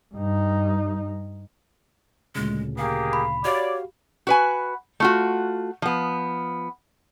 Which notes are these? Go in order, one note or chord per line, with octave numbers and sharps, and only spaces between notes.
G2 D#4
D2 A#2 C#3 G#3
A#3 G4 G#4 F5
B5
F#4 G4 C#5 D5 F5
F#4 B4 G#5
A3 F4 F#4
F3 B3